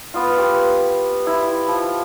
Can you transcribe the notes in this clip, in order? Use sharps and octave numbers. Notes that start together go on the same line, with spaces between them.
B3 F4
G4 B4
E4
F3